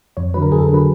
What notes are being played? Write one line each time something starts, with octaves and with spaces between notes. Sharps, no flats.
F2 C#5
D3 F#3 B4
A#4
F2 G#4
A4
A#4
D3 F#3 B4